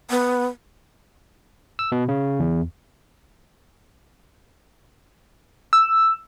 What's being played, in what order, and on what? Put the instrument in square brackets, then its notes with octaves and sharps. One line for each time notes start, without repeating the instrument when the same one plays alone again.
[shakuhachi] B3
[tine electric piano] E6
B2
C#3
E2
[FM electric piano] E6